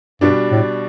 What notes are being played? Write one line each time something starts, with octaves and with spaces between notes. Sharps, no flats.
G2 B2 G3 D4
A2